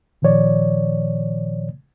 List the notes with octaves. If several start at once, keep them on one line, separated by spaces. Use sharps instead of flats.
A#2 D#3 F3 C#5 D5